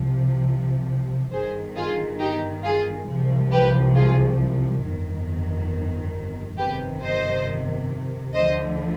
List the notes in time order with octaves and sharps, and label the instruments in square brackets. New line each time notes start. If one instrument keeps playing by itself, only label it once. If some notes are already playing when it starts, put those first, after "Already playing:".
Already playing: [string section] C2 C3 F3
G1 G2 D#3 G#4 C5
F4 G#4
D#4 G4
F4 G#4
C2 C3 F3
G4 B4
F4 G#4
G1 F2 D#3
G1 F2 C3 D#3 G4 B4
C5 D#5
D2 D3 F3 C5 D#5